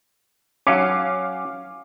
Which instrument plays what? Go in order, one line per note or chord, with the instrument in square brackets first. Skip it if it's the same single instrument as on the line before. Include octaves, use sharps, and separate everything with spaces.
[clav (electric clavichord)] F#3 C#4 [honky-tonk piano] F5 D6